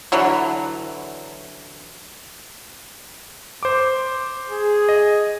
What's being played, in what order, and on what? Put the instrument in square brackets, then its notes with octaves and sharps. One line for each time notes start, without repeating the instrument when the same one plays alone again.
[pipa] D3 E3 F#3
[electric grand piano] C5 D6
[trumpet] G#4
[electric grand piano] D#5